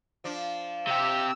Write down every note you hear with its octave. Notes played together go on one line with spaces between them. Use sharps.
F3 D4
C3 G4 E6